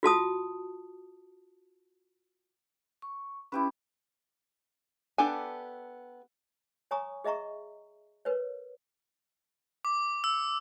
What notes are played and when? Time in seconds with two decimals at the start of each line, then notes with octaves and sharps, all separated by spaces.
0.03 F4 F#4 A5 D#6
3.02 C#6
3.52 C#4 E4 G4 B4
5.18 B3 D4 G4 A4 G#5
6.91 C#5 G#5 A#5 C#6 D#6
7.24 G#4 D#5 E5 A#5 C#6
8.25 A#4 B4 C#5
9.85 D6
10.24 E6